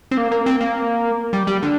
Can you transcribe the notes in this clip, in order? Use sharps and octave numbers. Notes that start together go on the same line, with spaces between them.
C4
A#3
A#3
C4
A#3
G3
G3
D3